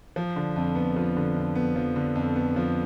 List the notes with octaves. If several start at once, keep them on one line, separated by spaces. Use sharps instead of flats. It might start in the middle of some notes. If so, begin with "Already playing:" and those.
F3
D3
F2
B3
F3
D3
F2
B3
F3
D3
F2
B3
F3